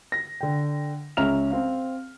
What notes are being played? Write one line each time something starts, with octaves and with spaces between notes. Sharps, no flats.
A#6
D3 G5
C#2 C#4 E5 A#5 F6 F7
C4 F5